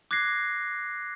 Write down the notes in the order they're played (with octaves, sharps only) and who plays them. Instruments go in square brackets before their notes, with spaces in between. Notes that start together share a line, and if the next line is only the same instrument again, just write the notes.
[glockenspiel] D6 F#6 G#6 A#6 C7